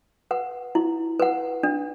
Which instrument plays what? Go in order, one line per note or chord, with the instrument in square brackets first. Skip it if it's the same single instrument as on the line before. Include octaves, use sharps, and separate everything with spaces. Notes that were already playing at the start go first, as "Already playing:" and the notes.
[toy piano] B4 F#5
E4
B4 F#5
D4